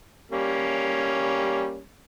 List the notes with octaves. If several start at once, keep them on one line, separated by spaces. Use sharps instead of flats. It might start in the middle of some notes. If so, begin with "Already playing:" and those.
G3 A#3 C#4